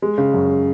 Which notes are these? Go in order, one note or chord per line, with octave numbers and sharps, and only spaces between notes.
G#3
C#3
F#2